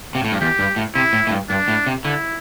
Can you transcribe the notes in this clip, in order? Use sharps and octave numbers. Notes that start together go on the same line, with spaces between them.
C3
A2
G2
E2 G4
G2
A2
C3 E4
A2
A2
G2
G2 D4
A2
C3
D3 E4